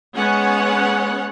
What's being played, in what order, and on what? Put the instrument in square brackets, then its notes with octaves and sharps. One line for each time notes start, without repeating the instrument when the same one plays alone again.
[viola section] G#3 B3 C#4 F#5